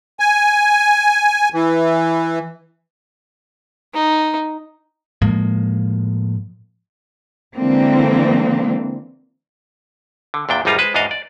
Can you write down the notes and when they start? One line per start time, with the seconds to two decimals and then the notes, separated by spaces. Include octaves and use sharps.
0.20 G#5
1.54 E3
3.94 D#4
5.22 A2 F3 G#3 A#3
7.56 D3 E3 G#3 A#3 C4
10.34 D3
10.49 E2 A#2 D4 G5
10.65 G#1 E2 G3 D#4 F4 A#5
10.78 G#3 B4 C5
10.94 E2 G#2 D4 F#4 D#5 F5
11.11 D5